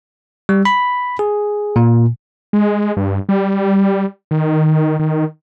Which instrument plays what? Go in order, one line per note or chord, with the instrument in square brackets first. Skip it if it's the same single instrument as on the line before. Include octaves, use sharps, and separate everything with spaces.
[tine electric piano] G3
B5
G#4
A#2
[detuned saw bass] G#3
G2
G3
D#3
D#3